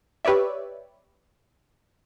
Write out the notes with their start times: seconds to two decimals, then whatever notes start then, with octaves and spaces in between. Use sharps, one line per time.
0.25 G4 B4 C#5 D5 E5